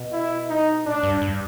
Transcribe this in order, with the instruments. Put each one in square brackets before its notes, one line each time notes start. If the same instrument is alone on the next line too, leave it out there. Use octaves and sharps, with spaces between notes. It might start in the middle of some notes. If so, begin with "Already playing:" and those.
Already playing: [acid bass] B2
[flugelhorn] E4
D#4
[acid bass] A2 [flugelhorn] D4
[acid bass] G2
G2